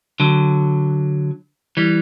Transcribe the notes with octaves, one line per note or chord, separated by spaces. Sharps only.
D3 F#3
E3 G3